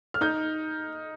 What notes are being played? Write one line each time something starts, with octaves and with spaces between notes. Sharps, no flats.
F6
D#4 G6